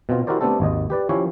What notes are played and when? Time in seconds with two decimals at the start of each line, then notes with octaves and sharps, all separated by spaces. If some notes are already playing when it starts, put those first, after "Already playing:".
0.09 B2 C4 F4
0.27 E4 F#4 G4 A#4 C5 D5
0.41 A3 B3 C4 D4 G4 A4
0.60 G#1 D#2 D#5
0.90 G4 B4 D5
1.09 F3 C#4 E4 G4 C#5